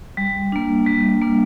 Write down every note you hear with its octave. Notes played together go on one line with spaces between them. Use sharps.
G3
A#3 D4
G3
A#3 D4